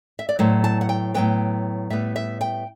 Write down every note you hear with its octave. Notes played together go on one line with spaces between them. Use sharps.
E5
D5
A2 F#3 B3 C5
A5
F#5
G5
A2 F#3 B3 G5
A2 G3 B3 E5
E5
G5